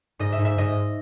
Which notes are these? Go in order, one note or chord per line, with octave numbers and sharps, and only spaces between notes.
G#2 D#5
E5
G#2
E5
G#2 D#5